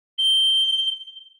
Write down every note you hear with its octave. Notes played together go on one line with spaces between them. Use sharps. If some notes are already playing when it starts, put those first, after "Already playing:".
G7